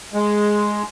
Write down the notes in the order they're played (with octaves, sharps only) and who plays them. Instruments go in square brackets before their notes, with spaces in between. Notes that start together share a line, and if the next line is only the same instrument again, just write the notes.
[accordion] G#3